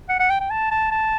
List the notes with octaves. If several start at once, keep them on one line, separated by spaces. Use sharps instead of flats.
F#5
F#5
G5
G5
A5
A5
A5